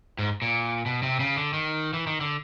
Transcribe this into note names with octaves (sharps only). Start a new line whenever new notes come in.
G#2
A#2
B2
C3
C#3
D3
D#3
E3
D#3
D3